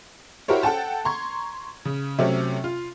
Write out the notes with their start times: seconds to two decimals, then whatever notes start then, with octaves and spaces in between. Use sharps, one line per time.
0.48 E4 F#4 G4 A#4 C5 C#5
0.63 A4 F#5 G5 A5
1.05 A#5 C6 C#6 G#6
1.85 C#3
2.19 C3 F#3 A3 C4 C#4
2.64 F4